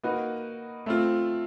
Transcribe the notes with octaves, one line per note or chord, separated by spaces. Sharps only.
A#3 D#4 F#4 B4
A3 C4 F4